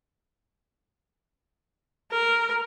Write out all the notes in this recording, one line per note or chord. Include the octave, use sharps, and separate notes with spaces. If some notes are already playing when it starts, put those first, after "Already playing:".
A#4